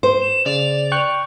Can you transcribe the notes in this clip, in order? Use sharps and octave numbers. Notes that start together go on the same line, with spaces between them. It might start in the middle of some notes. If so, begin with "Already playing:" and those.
C5
E7
C#3 D5 F7
G5 C#6 F#6